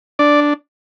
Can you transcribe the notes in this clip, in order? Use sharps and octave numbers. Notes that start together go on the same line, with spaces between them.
D4 D5